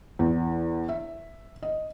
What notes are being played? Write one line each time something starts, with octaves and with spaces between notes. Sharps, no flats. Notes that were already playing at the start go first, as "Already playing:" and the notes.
E2
E5
D#5